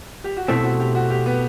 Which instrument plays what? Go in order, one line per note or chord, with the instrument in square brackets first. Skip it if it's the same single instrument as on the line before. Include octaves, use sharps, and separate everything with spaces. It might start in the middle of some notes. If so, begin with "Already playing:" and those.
[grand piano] G4
F#4
[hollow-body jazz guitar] B2 A3 C4 [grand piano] E4
[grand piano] F#4
G4
F#4
G4
B3